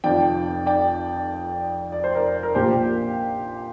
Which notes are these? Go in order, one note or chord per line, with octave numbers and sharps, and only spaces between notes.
F1 F2 F3 D5 G5
D5 G5
D5
C5
A#4 D5
A#4
A#1 A#2 F3 A#3 G4 C5